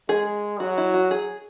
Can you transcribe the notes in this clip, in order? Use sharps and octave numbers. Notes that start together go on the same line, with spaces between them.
G#3 G#4
F#3 F#4
E4
F#4
G#4